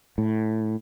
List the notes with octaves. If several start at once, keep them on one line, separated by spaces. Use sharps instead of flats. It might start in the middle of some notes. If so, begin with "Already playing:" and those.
A2